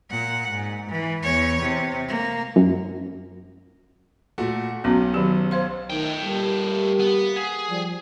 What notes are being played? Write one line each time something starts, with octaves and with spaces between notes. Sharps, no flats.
A#2 F#5
G#2
E3
E2 C#5
C3
A#3
F#2
A#2 A3 F#4
B1 B3 C#4 F#4
D#3 F#3 G4
C5 F5 C6
D#3 A3 G5
G3 A#3 G4
B3
G#4
F3 G3